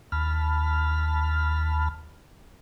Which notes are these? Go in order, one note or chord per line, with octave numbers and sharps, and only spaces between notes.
D#2 A5 B5 F6